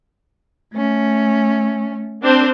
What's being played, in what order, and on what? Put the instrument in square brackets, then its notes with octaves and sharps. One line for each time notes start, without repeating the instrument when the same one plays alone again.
[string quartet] A3 C#4
[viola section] C4 D4 C5